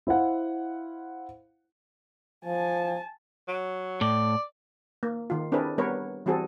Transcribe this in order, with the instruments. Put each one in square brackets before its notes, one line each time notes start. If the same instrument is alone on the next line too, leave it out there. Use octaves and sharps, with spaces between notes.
[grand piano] E4 C5 F5 F#5
[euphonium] F3 [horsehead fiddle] G#5 A5
[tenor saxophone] F#3
[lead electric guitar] A2 [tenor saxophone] D5
[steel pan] A#3
D#3 F4
C4 D4 E4 G#4 A#4 B4
G3 B3 A#4 B4 C#5
E3 G3 C4 F#4 G#4 A4